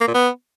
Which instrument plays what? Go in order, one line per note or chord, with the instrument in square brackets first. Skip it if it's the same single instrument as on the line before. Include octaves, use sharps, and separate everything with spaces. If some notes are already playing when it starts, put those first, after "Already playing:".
[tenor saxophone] A#3
A#2
B3